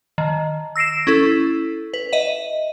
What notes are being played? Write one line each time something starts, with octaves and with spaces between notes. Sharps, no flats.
D#3
E6 A#6 C7 D7 E7
C#4 E4 A4
B4
D#5 E5